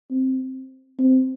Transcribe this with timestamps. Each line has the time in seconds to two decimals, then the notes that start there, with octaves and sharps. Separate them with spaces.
0.10 C4
0.99 C4